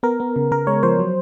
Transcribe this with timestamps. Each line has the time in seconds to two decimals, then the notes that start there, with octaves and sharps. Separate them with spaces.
0.03 B3 A#4
0.20 B3
0.36 C#3
0.51 C#3 A#4
0.67 G#3 C#5
0.83 F3 C5
0.99 F#3